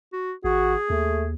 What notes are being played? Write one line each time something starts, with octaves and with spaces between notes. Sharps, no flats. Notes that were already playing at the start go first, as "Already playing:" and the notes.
F#4
G#1 F#4 G#4
D#2 A3